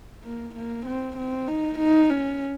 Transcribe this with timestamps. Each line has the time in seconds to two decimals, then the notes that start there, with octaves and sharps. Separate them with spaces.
0.24 A#3
0.55 A#3
0.86 C4
1.17 C4
1.48 D#4
1.79 D#4
2.10 C#4